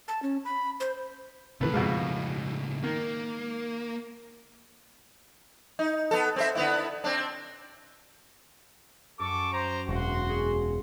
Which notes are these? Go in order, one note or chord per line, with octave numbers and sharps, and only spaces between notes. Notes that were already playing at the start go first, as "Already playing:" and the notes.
A5
C#4
B5
C5
C#2 A2 C3 D#3 E3 A3 B4
F2 B2 G#3 F5
D#3 A#3
D#4
B3 A4
C4 C5 E5
D3 B3 E4
C4 D4
F#2 A4 C#6 D6
C5 A#5
E1 F#4 C6
G#4